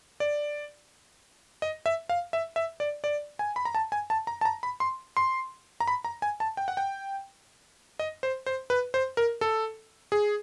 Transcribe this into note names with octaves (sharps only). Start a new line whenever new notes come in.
D5
D#5
E5
F5
E5
E5
D5
D5
G#5
B5
A#5
A5
G#5
A5
A#5
A5
A#5
B5
C6
C6
A#5
B5
A#5
G#5
A5
G5
F#5
G5
D#5
C5
C5
B4
C5
A#4
A4
G#4